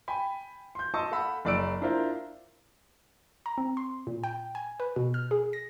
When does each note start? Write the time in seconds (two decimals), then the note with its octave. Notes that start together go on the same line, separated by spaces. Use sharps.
0.08 G5 G#5 B5
0.75 C6 G6
0.94 D#5 A5 C6 C#6 D#6 E6
1.12 A4 F5 F#5 B5 E6
1.45 F#1 F#2 D5 D6 E6 D7
1.82 D4 E4 F4 A#4 C5 F5
3.46 A#5
3.58 C4
3.77 C6
4.07 A#2
4.24 G5
4.55 G#5
4.80 B4
4.96 B2
5.14 F6
5.31 G#4
5.53 A#6